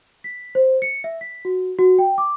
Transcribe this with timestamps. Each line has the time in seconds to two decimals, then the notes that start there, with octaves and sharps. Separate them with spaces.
0.24 B6
0.55 C5
0.82 C#7
1.04 E5
1.21 B6
1.45 F#4
1.79 F#4
1.99 G5
2.18 D6